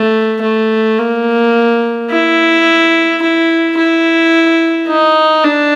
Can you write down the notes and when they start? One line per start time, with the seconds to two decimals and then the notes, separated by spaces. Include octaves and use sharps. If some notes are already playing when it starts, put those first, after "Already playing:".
Already playing: A3
0.42 A3
0.98 A#3
2.10 E4
3.22 E4
3.78 E4
4.88 D#4
5.44 D4